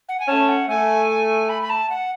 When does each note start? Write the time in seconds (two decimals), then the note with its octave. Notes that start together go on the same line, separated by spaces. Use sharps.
0.09 F#5
0.20 G#5
0.28 A3 C#4 A5
0.49 F#5
0.68 A3 G#5
1.49 B5
1.62 B5
1.70 A5
1.90 F#5